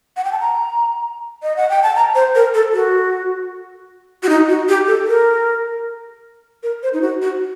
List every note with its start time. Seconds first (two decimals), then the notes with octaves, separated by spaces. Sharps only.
0.17 F#5
0.24 G5
0.32 A5
0.40 A#5
1.43 D#5
1.57 F#5
1.69 G5
1.83 A5
1.96 A#5
2.15 C5
2.35 A#4
2.54 A4
2.73 F#4
4.23 F#4
4.29 D#4
4.49 F#4
4.69 G4
4.87 A4
5.07 A#4
6.63 A#4
6.83 C5
6.93 D#4
7.02 F#4
7.22 F#4